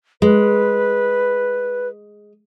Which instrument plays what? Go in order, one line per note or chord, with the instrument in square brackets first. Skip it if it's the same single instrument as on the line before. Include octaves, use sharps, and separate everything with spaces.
[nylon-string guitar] G#3 [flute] B4